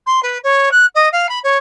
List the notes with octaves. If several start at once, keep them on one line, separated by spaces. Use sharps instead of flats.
C6
B4
C#5
F#6
D#5
F5
B5
C#5